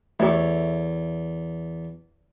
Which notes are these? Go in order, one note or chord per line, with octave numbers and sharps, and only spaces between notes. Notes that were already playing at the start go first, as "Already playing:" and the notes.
E2 A3 G4 A4 C#5 E5